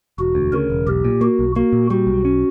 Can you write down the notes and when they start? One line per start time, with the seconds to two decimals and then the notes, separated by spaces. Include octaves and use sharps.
0.18 E1 F#4
0.35 D2
0.53 C#3 A#4
0.70 E1
0.87 B1 G4
1.05 A#2
1.21 A#3 F#4
1.39 B1
1.56 A#3 F#4
1.73 A#2
1.90 G3 F#4
2.07 B1
2.25 C#4